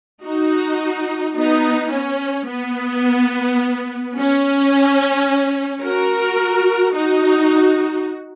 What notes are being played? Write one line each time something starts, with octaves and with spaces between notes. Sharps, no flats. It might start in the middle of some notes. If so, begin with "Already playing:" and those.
D#4 F#4
B3 D#4
C#4
B3
C#4
F#4 A#4
D#4 F#4